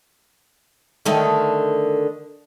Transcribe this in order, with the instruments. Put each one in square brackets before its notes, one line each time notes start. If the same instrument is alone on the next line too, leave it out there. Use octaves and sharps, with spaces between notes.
[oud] D3 D#3 A3